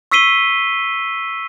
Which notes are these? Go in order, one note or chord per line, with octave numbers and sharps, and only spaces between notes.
C#6 E6 B6 C7 D#7 G7